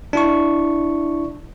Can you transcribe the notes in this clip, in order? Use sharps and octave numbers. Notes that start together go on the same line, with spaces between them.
D4 E4 C#6